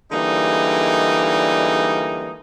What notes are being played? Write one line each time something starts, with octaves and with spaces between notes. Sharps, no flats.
D3 E3 G3 G#3 A#3 D#4